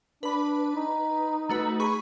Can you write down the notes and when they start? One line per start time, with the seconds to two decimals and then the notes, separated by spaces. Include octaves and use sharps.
0.23 D4 B4 B5
0.76 D#4
1.49 A3 F#4 B4
1.80 G#4 B5 C#6